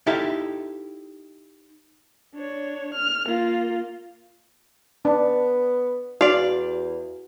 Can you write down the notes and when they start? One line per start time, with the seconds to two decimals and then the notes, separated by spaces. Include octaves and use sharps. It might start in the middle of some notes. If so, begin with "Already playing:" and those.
0.07 D#4 E4 G4 A4 E5 F5
2.35 D4 C#5
2.93 F6
3.26 A#3 F4
5.05 B3 D4
6.21 E2 F#4 D5 F5